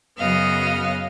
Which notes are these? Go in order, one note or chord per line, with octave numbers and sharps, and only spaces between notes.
F#2 C#3 F#3 B3 D#5 F5